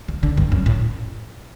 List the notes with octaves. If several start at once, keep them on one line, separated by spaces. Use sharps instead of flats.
D3
D3
G2
F#2
A2